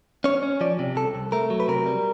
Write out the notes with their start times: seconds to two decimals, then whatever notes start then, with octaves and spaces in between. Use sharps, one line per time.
0.24 C#4 C#5
0.43 C#4
0.61 F3 D5
0.79 C3
0.96 C2 A4
1.15 C2
1.32 A3 A#4
1.50 F#3
1.60 B4
1.68 C3 A#4
1.86 G3